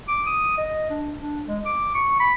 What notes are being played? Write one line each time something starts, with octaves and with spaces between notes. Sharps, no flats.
D6
D#6
D#5
D4
D4
G#3
D6
C#6
B5